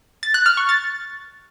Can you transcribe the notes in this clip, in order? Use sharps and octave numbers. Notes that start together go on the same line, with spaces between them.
A6
F#6
F6
C#6
A6